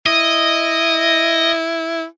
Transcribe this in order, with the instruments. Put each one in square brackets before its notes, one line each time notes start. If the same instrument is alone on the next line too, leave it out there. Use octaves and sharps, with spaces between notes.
[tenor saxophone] E4 [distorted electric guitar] D#5